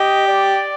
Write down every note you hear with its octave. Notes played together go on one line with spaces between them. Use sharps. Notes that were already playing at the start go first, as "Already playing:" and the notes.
Already playing: G4 D#5
D5